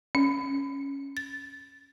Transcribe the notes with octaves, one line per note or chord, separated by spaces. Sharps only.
C#4
A6